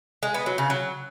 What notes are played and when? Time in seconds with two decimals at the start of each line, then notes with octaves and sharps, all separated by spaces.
0.23 G#3
0.34 B3
0.46 F#3
0.58 C#3
0.70 F#3